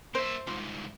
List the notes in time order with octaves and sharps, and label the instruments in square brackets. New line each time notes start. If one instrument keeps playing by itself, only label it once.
[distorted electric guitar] A#3 E5 [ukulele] C5
[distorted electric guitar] C2 G#2 [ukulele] F4